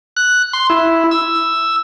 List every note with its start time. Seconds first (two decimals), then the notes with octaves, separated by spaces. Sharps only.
0.17 F#6
0.53 C6
0.70 E4
1.11 E6